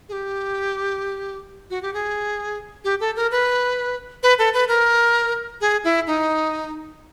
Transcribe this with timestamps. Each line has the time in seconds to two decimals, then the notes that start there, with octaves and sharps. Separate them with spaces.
0.09 G#4
0.12 G4
1.70 F#4
1.82 G4
1.94 G#4
2.84 G4
3.00 A4
3.16 A#4
3.31 B4
4.23 B4
4.39 A4
4.54 B4
4.68 A#4
5.61 G#4
5.84 E4
6.07 D#4